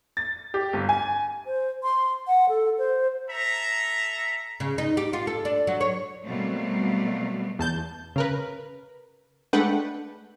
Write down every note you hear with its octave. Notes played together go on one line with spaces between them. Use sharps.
A6
G4
G1
G#5
C5
C6
F#5
A4
C5
A4 E5 A#5
C#3
D#4
G4
F4
A4
D4
F#3
C#5
B2 F#3 G3 A3 A#3 C4
E2 A5 G6
C#3 A#4 B4
G#3 A3 D4 B4 F#5 G5